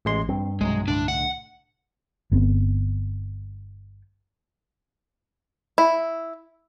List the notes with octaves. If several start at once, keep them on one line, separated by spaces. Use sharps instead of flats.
A1 G#3 C6
G2 C4
B1 C3 F#3 G#3
C2 A2 D3 D4
F#5
G1 B3 C4
E4